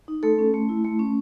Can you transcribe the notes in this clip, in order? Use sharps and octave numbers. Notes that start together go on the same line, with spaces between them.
D#4
A3 A4
C#4
A3
E4
A3
C#4